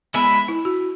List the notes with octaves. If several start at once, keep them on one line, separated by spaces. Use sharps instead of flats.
G#3 B3 E4 B4 E5
E4
F#4